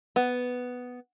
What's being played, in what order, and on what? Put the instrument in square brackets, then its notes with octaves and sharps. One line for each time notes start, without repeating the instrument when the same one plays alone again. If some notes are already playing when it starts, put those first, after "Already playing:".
[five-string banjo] B3